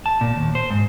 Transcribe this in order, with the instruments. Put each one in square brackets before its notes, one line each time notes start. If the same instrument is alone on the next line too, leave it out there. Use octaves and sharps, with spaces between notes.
[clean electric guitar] A5
A#2
D#2
C5
G#2